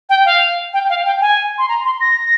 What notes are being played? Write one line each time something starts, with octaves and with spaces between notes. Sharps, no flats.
G5
F5
G5
F5
G5
G#5
C6
A#5
C6
A#6